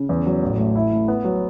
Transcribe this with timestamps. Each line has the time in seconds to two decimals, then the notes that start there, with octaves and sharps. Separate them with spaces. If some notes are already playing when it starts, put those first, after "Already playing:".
Already playing: C#3
0.09 E2
0.26 F#3
0.43 A1
0.58 A3
0.76 E4
0.92 A3
1.08 B3
1.25 F#3